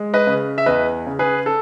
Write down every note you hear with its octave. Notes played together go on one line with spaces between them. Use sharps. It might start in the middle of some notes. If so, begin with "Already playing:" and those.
Already playing: G#3
B4 D#5
C#3
E5
E2 B4 D#5
C#3
G#4 B4
A4